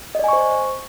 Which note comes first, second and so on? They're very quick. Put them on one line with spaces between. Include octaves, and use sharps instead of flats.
D#5 D5 G#5 C#6 C5